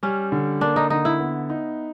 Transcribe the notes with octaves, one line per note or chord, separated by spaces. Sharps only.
G3 C#4
D3
A#3 D4
D#4
D3 D#4
E4
B3
D#4